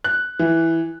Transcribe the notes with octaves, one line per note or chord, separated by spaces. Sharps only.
F#6
E3